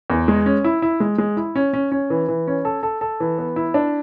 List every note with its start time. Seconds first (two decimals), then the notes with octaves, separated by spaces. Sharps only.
0.10 E2
0.28 G#3
0.46 C#4
0.64 E4
0.82 E4
1.00 G#3
1.18 G#3
1.37 E4
1.56 C#4
1.73 C#4
1.92 C#4
2.10 E3
2.28 E3
2.47 C#4
2.65 A4
2.83 A4
3.01 A4
3.20 E3
3.38 B3
3.56 E4
3.74 D4